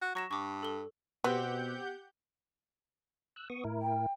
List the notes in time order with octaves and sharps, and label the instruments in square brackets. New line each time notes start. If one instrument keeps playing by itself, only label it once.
[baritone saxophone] F#4
[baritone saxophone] F#3 [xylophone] C#6 A#6 E7
[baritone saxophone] G2 [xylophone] C#6 D6
[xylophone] A4 G7
[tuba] B2 [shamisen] B3 [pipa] C4 [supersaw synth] G4 F#5 G6
[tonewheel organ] E6 F#6
B3 C#6 D#6
A2 E4 A#4
[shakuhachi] G5